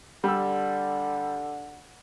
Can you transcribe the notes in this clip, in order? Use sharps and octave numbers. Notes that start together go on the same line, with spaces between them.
D3 G3 E6